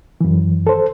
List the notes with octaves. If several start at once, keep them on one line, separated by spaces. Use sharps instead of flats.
F#2 E3
A4 C5